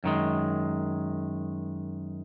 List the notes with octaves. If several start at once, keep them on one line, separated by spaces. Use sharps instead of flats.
F#2 D#3 G#3